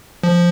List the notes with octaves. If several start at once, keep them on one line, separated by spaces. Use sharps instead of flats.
F3